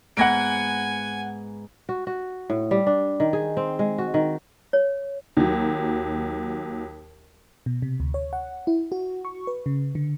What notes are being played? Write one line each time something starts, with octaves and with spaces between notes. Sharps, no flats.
G#2 B3 F#5 G#5 A#6 D7
F#4
F#4
A2
G3
D4
D#3
G#4
C4
G#3
F#4
D#3
C#5
D#2 F#3
B2
C3
D2
C#5
F#5
E4
F#4
C#6
B4
C#3
D3